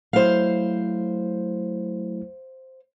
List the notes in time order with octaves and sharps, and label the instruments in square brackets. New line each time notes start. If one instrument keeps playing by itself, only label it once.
[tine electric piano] F#3 A3 E4 [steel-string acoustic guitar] C5 F5